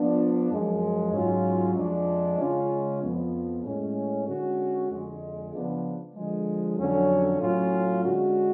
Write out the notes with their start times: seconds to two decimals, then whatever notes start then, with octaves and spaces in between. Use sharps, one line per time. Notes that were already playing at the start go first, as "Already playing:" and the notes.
Already playing: F3 B3 D4 F4
0.50 F#2 F3 G#3
1.13 G#2 F#3 C#4 F4
1.75 F2 F3 G#3 D4
2.38 C#3 G#3 C#4 F4
3.01 F2 F3 B3
3.63 A2 G#3 C#4
4.26 D3 G#3 C#4 F#4
4.90 F2 D3 G#3
5.52 C#3 F3 B3 D4 F4
6.14 D3 F3 G#3
6.77 F2 D3 F#3 C#4
7.40 A2 F#3 C#4 F4
8.03 D3 G#3 C#4 F#4